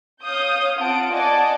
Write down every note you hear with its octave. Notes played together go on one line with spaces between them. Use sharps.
C#5 F5 D#6 G6
C4 F4 F#5 A5 D7
D5 D#5 F#5 G#5 A5 D6